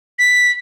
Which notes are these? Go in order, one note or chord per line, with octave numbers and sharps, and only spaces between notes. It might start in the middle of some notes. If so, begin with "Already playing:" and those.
B6